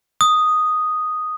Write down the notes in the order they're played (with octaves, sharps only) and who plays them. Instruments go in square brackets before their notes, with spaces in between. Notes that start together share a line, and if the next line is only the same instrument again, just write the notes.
[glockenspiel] D#6